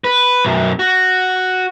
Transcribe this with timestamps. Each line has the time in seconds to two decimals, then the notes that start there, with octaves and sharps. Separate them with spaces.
0.04 B4
0.45 B1 F#2
0.79 F#4